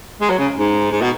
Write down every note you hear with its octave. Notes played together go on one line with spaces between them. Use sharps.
G#3
F#3
C#3
G#2
G#2
B2